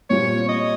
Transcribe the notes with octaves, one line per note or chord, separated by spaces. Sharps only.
A#2 G3 C4 F4 C#5
D#5